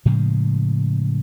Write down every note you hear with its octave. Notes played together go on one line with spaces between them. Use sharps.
A2 C#3 F3 G#3